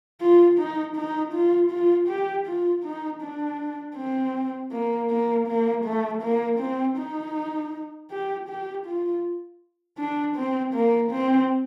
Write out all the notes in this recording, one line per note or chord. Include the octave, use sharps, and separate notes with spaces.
F4
D#4
D#4
F4
F4
G4
F4
D#4
D4
C4
A#3
A#3
A#3
A3
A#3
C4
D#4
G4
G4
F4
D4
C4
A#3
C4